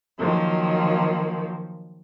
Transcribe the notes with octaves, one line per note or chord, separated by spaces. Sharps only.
D#3 F3 F#3 A#3